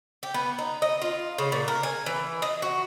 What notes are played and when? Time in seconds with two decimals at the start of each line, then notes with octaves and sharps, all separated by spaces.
0.23 G4
0.34 B3
0.59 D#4
0.82 D#5
1.02 F4
1.38 C#3
1.52 A#2
1.68 A#4
1.83 G#5
2.06 E3
2.42 D#5
2.62 F#4